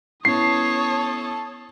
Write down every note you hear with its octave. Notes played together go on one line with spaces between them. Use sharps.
B3 C#4 E4 A4 C#5 A5 D#6 C7